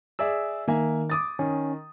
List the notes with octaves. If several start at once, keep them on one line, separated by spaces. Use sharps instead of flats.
G#4 D5 E5 E6
D#3 A#3 E5 G#5
D6 D#6 A6
D#3 C#4